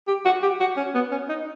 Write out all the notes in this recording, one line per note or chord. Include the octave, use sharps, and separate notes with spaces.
G4
F#4
G4
F#4
C#4
B3
C#4
D#4